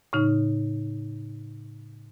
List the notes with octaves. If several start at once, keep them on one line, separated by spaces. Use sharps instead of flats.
A2 C#3 D#4